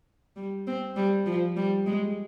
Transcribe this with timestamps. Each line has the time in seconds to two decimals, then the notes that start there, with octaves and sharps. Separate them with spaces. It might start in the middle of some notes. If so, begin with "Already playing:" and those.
0.36 G3
0.67 C4
0.96 G3
1.26 F3
1.56 G3
1.86 G#3